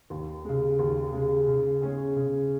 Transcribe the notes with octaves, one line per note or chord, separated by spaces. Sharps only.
D#2
C#3 G#3
D#2
C#3 G#3
C#3
G#3 C#4 G#4
C#3